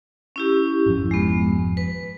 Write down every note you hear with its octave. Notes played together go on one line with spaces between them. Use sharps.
C#4 E4 G4
G#1 F2 F3
G#3 B3
B4